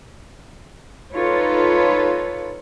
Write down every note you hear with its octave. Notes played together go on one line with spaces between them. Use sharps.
D#4 F4 A4 B4 C#5